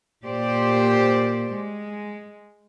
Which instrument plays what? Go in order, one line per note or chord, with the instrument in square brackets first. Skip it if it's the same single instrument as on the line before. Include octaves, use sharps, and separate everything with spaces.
[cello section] A#2 G4 C5 D5
G#3